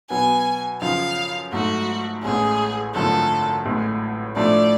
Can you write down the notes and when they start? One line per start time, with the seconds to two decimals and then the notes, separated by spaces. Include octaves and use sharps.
0.10 B2 F#3 B3 G#5
0.81 F#2 C#3 F3 F5
1.52 G#2 F#3 A3 F#4
2.23 A1 A2 G#3 C#4 G#4
2.94 G#1 F#2 D3 F3 A3 A4
3.65 A1 A2 G#3
4.36 A2 F3 A3 D4 D5